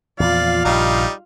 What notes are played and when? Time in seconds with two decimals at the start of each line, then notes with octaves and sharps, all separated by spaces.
0.20 E2 A#2 F3 F4 D5 F5
0.65 A#1 G2 G3 D#4